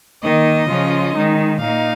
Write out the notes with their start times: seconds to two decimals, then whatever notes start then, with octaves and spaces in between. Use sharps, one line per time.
0.22 D#3 A#3 D#4 D#5
0.68 C#3 F3 C#4 F4
1.14 D#3 G#3 D#4
1.60 A#2 A#3 D#4 F5